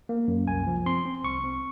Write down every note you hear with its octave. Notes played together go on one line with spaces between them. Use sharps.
A#3
F#2
C2 G#5
F3
C4 C6
C4
C2 C#6
C4